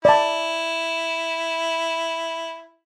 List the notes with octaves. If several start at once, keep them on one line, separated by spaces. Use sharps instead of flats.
E4 D5 A5